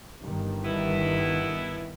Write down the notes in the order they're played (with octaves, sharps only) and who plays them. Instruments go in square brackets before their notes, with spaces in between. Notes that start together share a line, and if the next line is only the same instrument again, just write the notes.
[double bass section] G1 G2 D#3
[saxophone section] B2 B3 E4